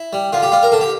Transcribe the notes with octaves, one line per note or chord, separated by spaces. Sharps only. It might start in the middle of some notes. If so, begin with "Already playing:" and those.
Already playing: E4
G3
D3 F4
G4
G3 F4
A#4
D3 A4
G4